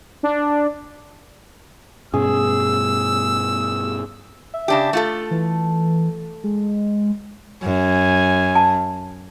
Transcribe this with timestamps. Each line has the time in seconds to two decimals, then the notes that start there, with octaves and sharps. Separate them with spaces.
0.23 D4
2.13 G2 B2 C#4 G#4 E6
4.54 E5
4.68 C#3 D4 G4
4.93 A3 F4 A4
5.31 E3
6.44 G#3
7.63 F#2 G#5
8.55 A5